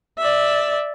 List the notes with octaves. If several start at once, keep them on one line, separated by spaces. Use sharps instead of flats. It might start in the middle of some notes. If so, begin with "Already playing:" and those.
D5 E5